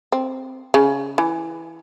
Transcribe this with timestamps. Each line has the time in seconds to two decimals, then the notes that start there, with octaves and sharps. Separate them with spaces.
0.12 C4
0.74 C#3
1.18 E3